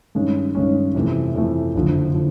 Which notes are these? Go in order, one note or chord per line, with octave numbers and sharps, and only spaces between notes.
G2 D#3 G#3 C#4
G2 D#3 G#3 C#4
F2 C3 E3 A3
F2 C3 E3 A3
F#1 F2 D3 F3
D3 F3